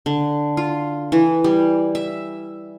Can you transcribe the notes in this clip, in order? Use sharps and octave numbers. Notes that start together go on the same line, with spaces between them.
D3
F4
E3
G3
E5